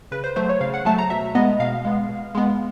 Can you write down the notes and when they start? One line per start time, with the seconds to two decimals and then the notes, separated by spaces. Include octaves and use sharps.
0.12 C#3 B4
0.24 C5
0.36 F#3 A3 C5
0.49 C#5
0.61 C#3 F5
0.74 F#5
0.85 F#3 A3 A5
0.98 A#5
1.10 B2 E5
1.35 G#3 B3 D#5
1.59 B2 F5
1.85 G#3 B3
2.09 B2
2.35 G#3 B3